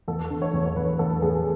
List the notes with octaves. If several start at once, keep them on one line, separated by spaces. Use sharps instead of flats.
E2 A4
D3
C#5
E2
C#5
E2 B4
E2 A4
E2 G#4